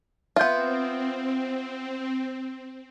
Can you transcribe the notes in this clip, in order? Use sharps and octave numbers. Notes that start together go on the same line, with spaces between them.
B3 C4 F4 E5 G6